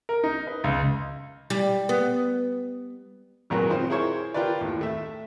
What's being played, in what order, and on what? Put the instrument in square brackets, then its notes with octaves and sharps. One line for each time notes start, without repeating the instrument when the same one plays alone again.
[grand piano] A#4
D#4
B4
C#2
[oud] G3
B3
[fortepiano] G#1 A#2 F#3 A#3 B4 F#6
C4 D#4 F4 C5
E4 G#4 A#4 C5 C#5 C#6
F4 G4 A#4 B4 D5
D#2 A2
A3 E5